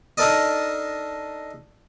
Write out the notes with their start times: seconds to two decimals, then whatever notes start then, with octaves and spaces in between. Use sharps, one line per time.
0.17 D4 D#4 A4 A#4 D5 D#5